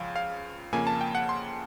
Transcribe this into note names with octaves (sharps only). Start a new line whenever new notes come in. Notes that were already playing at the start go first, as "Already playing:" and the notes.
Already playing: C#2 C#3 F3 F5
F5
F2 C#3 F3 A#3 G#5
A5
G5
F#5
C6